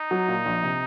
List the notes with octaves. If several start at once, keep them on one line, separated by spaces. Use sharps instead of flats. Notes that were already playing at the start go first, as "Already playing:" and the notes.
Already playing: D#4
F#3
A#2
A#1
C3